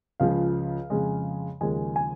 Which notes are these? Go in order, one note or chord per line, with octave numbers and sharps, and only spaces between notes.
C#2 C#3 F3 F5
F2 C#3 G#3
D#2 C#3 F3 G#3 G#5
G#5